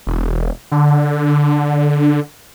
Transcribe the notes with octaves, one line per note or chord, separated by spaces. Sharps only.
E1
D3